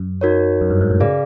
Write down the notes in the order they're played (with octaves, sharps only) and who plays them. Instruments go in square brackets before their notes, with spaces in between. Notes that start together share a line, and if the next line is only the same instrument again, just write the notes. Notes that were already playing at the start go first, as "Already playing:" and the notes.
Already playing: [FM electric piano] F#2
[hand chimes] D#4 F#4 A#4 C#5
[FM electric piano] F#2
G2
G#2
A2
[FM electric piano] C#3 [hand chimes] G#4 B4 D5 F5